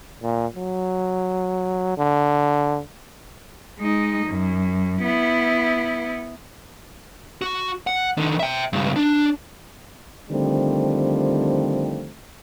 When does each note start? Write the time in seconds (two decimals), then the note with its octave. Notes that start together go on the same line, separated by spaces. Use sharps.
0.22 A#2
0.56 F#3
1.98 D3
3.79 G#3 D#4
4.27 F#2
5.02 B3 E4
7.42 F#4
7.87 F#5
8.18 D3 D#3
8.39 E5 G5
8.73 C#2 G2
8.96 D4
10.31 D3 D#3 F3 G3 A3 C4